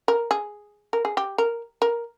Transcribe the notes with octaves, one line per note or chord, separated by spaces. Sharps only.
A#4
G#4
A#4
G#4
G4
A#4
A#4